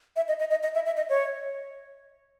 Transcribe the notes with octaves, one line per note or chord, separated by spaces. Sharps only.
E5
D#5
D#5
D#5
D#5
E5
E5
D#5
C#5